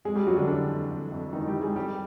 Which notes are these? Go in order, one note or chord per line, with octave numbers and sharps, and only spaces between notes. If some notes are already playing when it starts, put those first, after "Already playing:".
F2 G#3 G#4
G3 G4
F2 F#3 F#4
D3 D4
D3 E3 D4
F2
F2
F2
D#3 E3 D#4
G3 G4
E3
G#3 G#4
F2 G3 G4